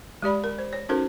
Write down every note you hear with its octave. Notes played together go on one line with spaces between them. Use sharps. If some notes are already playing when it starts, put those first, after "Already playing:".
G#3 G4 D5 B5
A#4
C5
C#5
C#4 D#4 F#4 A4 A#4 C5